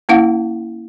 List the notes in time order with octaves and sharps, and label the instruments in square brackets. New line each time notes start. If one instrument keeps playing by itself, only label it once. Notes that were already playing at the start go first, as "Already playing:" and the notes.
[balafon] A#3 C#4 E4 F5 F#5